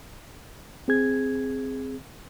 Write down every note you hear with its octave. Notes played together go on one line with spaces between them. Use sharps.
C4 G#4 G#6